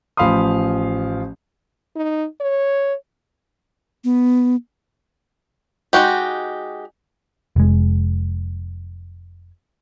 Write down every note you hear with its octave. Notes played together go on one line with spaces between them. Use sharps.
A1 F3 F5 B5 C6 D#6
D#4
C#5
B3
G#3 D#4 F#4 G4
F1 G#3